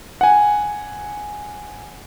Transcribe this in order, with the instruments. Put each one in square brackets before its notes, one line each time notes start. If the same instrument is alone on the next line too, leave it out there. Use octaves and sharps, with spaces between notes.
[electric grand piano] F#5 G#5